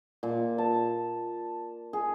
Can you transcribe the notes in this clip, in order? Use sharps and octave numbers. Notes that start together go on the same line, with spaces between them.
A#2
A5
G#4